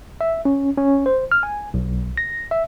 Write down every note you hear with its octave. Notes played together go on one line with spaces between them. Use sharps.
E5
C#4
C#4
C5
F6
G#5
B1
A#6
E5